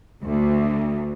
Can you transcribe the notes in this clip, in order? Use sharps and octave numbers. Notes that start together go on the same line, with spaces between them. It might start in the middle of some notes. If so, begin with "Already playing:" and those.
D2